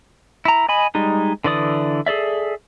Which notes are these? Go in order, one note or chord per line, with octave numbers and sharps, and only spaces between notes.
E4 A#5
D#5 G#5 B5
G3 G#3 D#4
D3 E3 D5 D#6
G#4 A4 D5 E5